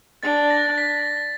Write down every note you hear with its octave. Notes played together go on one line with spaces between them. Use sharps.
D4 A6
A#6
B6